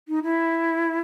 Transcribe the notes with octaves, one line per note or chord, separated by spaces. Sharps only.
D#4
E4